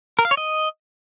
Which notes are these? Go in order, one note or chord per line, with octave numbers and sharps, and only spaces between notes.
A#4
F5
C#5
D#5